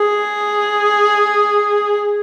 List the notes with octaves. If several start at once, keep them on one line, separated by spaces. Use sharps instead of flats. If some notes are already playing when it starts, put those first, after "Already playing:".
Already playing: G#4